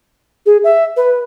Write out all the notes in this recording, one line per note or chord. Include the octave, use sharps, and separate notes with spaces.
G#4
E5
B4